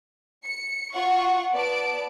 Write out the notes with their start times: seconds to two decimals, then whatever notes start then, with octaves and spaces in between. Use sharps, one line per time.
0.44 C#7
0.94 F4 F#5 C#6
1.53 B3 D5 A5 D7